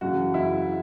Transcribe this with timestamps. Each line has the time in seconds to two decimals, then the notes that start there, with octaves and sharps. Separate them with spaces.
0.01 F#2 C#3 E3 F#4
0.34 E4